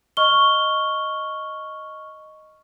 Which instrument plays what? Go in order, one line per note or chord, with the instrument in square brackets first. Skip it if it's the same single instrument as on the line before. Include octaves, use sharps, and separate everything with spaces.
[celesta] D#5 C#6 F6 G7